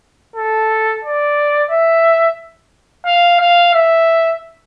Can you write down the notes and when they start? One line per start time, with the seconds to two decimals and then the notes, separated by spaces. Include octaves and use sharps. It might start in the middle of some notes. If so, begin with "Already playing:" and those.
0.36 A4
1.04 D5
1.71 E5
3.06 F5
3.41 F5
3.74 E5